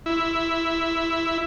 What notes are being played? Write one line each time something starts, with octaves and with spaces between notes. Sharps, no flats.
E4